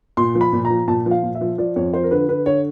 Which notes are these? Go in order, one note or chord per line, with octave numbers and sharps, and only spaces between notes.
A#2 C6
F3
B5
A#2
A#5
F3
A#2 A5
F3
F5
A#2
E5
F3
F3 D5
F2 C#5
F3 C5
A#4
D3 B4
D3 B4
D3 C#5